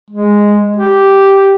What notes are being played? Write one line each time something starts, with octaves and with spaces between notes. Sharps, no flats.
G#3
G4